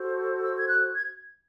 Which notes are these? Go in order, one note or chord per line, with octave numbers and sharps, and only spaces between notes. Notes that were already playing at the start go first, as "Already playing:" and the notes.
Already playing: F#4 A4 C5
E6
G#6
F#6
G#6